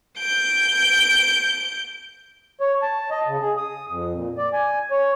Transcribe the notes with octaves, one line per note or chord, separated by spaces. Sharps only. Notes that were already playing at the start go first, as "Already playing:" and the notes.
G6 D7
C#5
A5
D#5
C#3
G#4
D#6
F2
A#2
D5
G#5
C#5